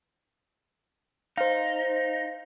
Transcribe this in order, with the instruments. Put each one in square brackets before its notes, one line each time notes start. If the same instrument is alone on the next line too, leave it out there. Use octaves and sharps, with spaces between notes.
[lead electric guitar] D#4 [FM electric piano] C5 F5